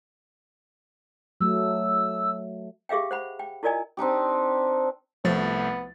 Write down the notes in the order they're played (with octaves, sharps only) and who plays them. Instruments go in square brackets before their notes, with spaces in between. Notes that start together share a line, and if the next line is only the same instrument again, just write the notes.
[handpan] F#3 A3 [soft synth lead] E6
[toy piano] G4 G#4 E5 F5 G5
C5 F#5 B5
G5
E4 F4 A#4 D5 D#5 G#5
[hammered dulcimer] C4 D4 D#4 G4
[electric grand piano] C2 A3 A6 [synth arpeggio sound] F3 [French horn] B3